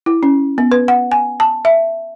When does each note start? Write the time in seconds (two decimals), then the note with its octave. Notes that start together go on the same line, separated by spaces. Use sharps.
0.06 E4
0.23 C#4
0.58 B3
0.72 B4
0.88 F#5
1.12 G#5
1.40 A5
1.65 E5